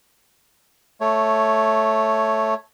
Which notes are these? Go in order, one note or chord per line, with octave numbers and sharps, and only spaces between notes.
A3 C#5